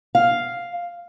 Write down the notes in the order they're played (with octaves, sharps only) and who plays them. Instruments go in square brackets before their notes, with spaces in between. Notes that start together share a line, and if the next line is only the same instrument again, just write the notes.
[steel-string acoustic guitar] F5